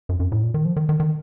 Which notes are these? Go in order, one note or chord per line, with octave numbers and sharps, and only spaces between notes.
F#2
F#2
A2
A#2
D#3
F3
D#3
D#3
D#3